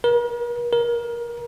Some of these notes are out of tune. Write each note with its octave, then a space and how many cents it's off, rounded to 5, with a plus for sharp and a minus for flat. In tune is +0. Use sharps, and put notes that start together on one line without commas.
A#4 +45
A#4 +25